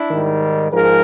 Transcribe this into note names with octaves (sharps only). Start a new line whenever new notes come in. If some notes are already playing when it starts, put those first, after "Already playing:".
Already playing: D4 E4
G#2 D#3 G3
G#2 F3 G#4 A#4